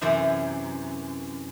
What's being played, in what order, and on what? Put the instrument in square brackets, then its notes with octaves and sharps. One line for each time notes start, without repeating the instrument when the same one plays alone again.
[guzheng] F#2 C3 E3 C5 E5